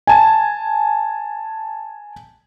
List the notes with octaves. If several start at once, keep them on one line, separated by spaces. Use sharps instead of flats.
G#5 A5